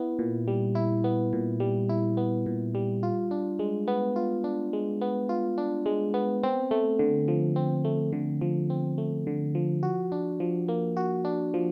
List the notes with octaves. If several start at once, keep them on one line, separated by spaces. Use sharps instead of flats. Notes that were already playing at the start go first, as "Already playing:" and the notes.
Already playing: B3 E4
A#2
G3
E4
B3
A#2
G3
E4
B3
A#2
G3
F4
D4
G#3
B3
F4
D4
G#3
B3
F4
D4
G#3
B3
C4
A3
D3
F3
C4
A3
D3
F3
C4
A3
D3
F3
F#4
D4
F3
A#3
F#4
D4
F3